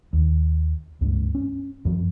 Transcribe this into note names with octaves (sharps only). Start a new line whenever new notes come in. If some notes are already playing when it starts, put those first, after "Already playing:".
D#2
C#2 G2
C#4
F#2 F3